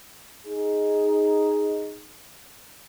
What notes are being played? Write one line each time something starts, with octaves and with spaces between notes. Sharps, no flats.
D#4 G#4